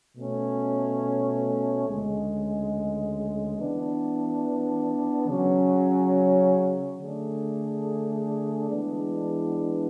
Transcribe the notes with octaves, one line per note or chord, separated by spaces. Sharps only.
B2 A3 C#4
D2 C#3 G#3
E3 B3 D4
C#3 F#3 C#4
D3 A3 D4 G#4
E3 G#3 B3 D4